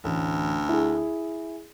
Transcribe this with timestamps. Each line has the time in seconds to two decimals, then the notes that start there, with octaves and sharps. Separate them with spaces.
0.04 A1 D2
0.69 E4 G#4